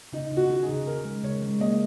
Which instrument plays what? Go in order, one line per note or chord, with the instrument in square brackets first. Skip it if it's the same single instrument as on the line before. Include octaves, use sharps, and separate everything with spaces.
[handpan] C#3 [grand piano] D#4
[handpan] C#3
[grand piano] F#4
[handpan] D#4
[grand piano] G#4
[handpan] C#3
[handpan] C#3 [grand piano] A#4
[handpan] G#3
[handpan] C#3 [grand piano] C#5
[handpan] G#3
[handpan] A#3 [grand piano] D#5